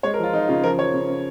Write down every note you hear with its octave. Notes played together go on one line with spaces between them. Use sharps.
G#3 C#5
A#4
F3
F4
F3 D#4
C#3 F4
F3 A#4
F3 C#5
C#3
C#3